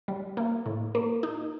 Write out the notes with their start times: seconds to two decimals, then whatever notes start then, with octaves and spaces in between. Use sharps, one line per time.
0.08 G3
0.37 A#3
0.66 A2
0.95 A#3
1.23 D#4